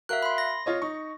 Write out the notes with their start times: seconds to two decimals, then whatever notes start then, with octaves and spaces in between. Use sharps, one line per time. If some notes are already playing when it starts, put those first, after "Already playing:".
0.09 F#4 A#4 E5 F5 F#6
0.23 B5 C6
0.38 A#6
0.66 F4 C#5 D#5
0.82 D#4 C#6